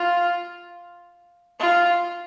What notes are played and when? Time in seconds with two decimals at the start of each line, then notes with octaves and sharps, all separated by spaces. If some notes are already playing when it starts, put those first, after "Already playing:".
Already playing: F4
1.60 F4